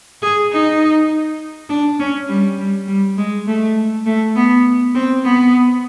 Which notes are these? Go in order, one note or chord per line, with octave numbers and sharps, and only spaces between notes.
G#4
D#4
D4
C#4
G3
G3
G3
G#3
A3
A3
B3
C4
B3